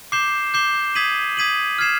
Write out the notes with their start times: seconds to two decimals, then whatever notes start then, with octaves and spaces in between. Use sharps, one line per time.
0.12 D6 G6 C7 E7 G7
0.54 D6 G6 C7 E7 G7
0.95 D#6 G#6 B6 D#7 F#7
1.37 D#6 G#6 B6 D#7 F#7
1.79 F6 G#6 C7 E7